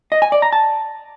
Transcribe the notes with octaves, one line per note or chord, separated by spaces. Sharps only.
D#5
G#5
D5
A#5
A5